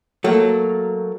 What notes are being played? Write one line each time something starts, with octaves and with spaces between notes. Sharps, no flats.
F#3 A3 A#3